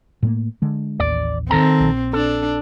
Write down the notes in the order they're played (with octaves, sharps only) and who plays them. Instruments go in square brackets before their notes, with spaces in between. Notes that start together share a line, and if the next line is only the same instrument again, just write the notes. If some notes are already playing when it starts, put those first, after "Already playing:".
[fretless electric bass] A2 A3 A#3
D3 G#3
[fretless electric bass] A1 D#2 [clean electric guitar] D5
[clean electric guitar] D#3 A4 A#5 [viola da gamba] C4
[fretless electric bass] A#1
[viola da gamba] D4 [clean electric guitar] A4